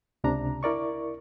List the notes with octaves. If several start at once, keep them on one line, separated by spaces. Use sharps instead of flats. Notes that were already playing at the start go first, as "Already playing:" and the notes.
C#2 C3 D4 A#5
E4 A#4 D5 C#6